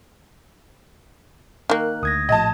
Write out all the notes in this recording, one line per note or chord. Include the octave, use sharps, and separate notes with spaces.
D#3 A#3 A#4 F#6
D2 D#6 G#6 A#6
A#1 A2 F3 D#5 A5 G#6